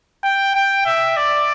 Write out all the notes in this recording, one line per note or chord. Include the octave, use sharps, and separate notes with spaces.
G5
G5
E5
D5